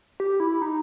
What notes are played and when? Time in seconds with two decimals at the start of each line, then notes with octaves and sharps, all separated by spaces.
0.20 G4
0.40 E4
0.62 D#4